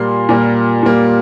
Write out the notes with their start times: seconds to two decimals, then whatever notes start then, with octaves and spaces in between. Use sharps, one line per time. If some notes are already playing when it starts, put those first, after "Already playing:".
Already playing: A#2 G3 A#3 C6
0.29 A#2 G3 A#3
0.83 A#2 G3 A#3